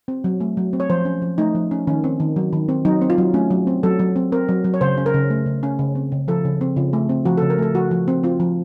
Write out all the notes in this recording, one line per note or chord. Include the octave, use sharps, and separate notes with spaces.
C4
F#3
A3
F#3
C4
C#5
F3 C5
C#4
F3
A3 D#4
F3
C#4
D#3 C#4
C4
D#3
F#3
D#3
C4
F#3 D#4
C4
F4
F#3
A3 C#4
F#3
C4
F#3 A4
F#3
C4
C4 A#4
F#3
F#3
C#5
C#3 C5
C#4
A#4
C#3
A3
C#3
C#4
C#3
C4
C#3
F3 A4
C#3
C4
C#3 F4
A3
C4
F3 F#4
A4
C#3
A#4
A3 A4
F3 F#4
F3
C4
C4 F4
F3